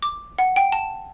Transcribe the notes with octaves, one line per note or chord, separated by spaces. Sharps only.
D6
F#5
G5
A5